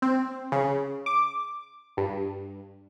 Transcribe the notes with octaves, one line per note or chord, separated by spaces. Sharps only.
C4
C#3
D6
G2